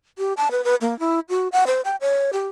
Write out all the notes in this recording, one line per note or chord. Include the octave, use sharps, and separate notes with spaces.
G4
A5
B4
B4
A#3
E4
F#4
F#5
C5
G5
C#5
G4